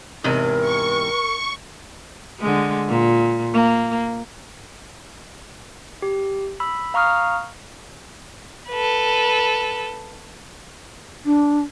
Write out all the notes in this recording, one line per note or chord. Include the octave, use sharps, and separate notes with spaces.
E2 G#2 C3 A#4
C#6
D3 G#3
A#2
A#3
G4
B5 E6
F5 A#5 C#6 D#6 F6
A4 B4
D4